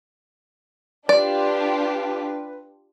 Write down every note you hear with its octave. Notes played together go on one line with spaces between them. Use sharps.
D4 F4 G4 B4 D5